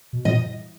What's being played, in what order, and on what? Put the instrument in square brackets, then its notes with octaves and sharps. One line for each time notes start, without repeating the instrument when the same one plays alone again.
[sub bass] B2
[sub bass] A#2 [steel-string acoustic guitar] D#5